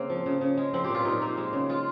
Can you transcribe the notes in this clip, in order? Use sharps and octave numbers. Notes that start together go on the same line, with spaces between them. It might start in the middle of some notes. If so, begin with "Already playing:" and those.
Already playing: C#3 A#3 C4
F3
C#3
C#3
G#3
F3 C4
G4
A#2 F4
A#2 D#4
A#3
G#3
C#3
G#3 F4